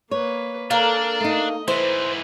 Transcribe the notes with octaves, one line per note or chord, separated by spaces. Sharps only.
A#3 B4 C#5
A#3 D4 A4 A#4
A3 D#4 D#5
G#2 E3 E4 B4 C5